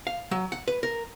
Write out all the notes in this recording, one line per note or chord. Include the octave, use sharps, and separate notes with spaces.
F5
F#3
F#5
B4
A#4